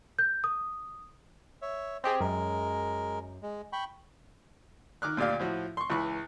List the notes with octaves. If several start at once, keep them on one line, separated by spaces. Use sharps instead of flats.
G6
D#6
C#5 E5
C4 G4 G#4 D#5 C6
F#2 G#3 A#4
G#3
G5 B5 C#6
D#3 D6 F6 F#6
D2 A#2 G4 D5 F5
A2 F3 F#4
C6 C#6
C#2 E3 B5 C#6